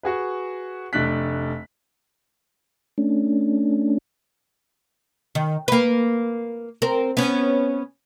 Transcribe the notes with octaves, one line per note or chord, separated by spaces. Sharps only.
F#4 G#4 B4
F1 A3 D4 F#6 B6
A3 C#4 D4
D#3
A#3 B4
C4 A#4
B3 C#4